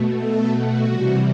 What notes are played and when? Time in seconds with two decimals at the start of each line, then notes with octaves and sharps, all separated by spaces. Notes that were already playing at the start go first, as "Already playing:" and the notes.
Already playing: B2 A3
0.13 A4
0.49 F#4
0.84 C3 E3 G3